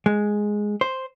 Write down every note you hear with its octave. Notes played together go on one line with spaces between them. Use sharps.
G#3
C5